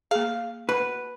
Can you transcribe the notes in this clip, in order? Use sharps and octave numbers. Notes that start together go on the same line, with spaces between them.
A#3 G#4 F5
B2 B4